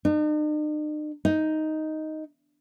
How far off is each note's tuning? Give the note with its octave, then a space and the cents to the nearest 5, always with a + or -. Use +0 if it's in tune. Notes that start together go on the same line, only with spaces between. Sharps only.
D#4 -45
D#4 +5